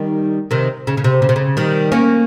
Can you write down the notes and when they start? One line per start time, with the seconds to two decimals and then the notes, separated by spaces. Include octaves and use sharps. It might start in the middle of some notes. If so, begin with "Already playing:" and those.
Already playing: D#3 G3
0.51 C3 D#3
0.87 C#3
0.97 C#3
1.04 C3
1.22 C#3
1.29 C3
1.36 C#3
1.57 D#3 G3
1.92 A#3 C#4